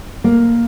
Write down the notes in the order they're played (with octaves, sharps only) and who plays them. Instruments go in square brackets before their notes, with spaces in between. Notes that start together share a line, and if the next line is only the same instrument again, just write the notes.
[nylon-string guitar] A#3